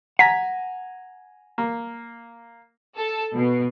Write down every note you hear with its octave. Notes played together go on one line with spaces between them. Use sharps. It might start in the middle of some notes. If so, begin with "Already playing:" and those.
F#5 G#5 A#5 B6
A#3
A4
B2